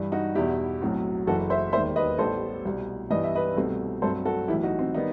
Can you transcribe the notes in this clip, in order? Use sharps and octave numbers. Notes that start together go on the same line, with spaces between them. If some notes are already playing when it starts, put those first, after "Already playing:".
Already playing: G2 E3 G3
D#4 F#4
E2 B2 G3 E4 G4
B1 A2 F#3 C4
F#1 F#2 E3 F#4 A4
C5 E5
E1 D#2 D#3 G3 C5 E5
B4 D#5
A1 A2 G3 B3 A4 C5
C2 B2 G3
G2 E3 G3 B3 D#5
E5
B4 D#5
C2 B2 A3 C4
G2 F#3 A3 C4 A4 C5
F#4 A4
B1 A2 E3 E4 G4
D#4 F#4
C4
D#3 G3 B3 D#4